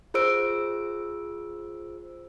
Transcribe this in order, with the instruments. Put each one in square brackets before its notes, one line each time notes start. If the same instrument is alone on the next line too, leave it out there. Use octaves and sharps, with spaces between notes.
[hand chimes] F4 G#4 C5 E6 D7